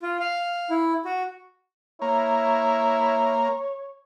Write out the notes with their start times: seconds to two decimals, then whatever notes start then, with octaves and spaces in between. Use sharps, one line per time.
0.03 F4
0.20 F5
0.70 E4
1.05 F#4
2.02 A#3 E4 C#5